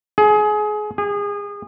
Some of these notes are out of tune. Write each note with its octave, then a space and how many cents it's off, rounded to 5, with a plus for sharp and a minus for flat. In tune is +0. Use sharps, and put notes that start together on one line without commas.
G#4 +25
G#4 -30